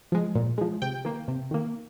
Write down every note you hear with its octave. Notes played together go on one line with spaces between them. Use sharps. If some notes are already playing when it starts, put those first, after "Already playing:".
F3 G#3
A#2
F3 G#3
C3 G5
D#3 A#3
C3
D#3 A#3